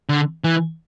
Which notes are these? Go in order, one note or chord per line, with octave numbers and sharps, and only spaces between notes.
D3
E3